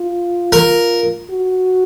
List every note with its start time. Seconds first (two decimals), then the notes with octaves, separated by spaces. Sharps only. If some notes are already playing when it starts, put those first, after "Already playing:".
Already playing: F4
0.52 A#4
1.30 F#4